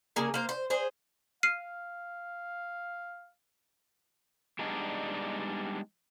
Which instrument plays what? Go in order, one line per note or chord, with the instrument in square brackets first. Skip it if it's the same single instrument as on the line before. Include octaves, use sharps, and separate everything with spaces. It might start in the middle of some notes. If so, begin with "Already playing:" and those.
[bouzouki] C#3 A#3 G#4 G#5
A#3 C5
C5
G#4 C5
[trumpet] F5 [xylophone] F6 C7 D#7
[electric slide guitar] G3 G#3 B3 D4 D#4